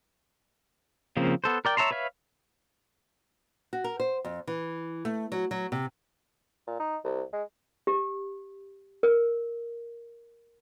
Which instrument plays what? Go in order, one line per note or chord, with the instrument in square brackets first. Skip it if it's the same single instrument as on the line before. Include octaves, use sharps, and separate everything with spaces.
[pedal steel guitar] C#3 F3 A#3 C4
B3 A4 C5
A#4 D5 G5
C#5 E5 A5 A#5 C6
B4 C#5 E5 F5
[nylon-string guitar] F#4
A#4
C5
F2
E3
A3
F#3
F#3
C3
[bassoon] A#2
D#4
C2
G#3
[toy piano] G4
A#4